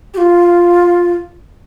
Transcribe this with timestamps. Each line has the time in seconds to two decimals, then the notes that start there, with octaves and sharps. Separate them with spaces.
0.14 G4
0.17 F4